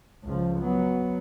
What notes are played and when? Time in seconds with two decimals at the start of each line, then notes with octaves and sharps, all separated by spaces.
0.24 C#2 F3
0.59 F#3 B3